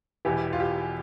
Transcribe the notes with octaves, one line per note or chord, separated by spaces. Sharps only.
E1 E2 E3 G4
F4
G4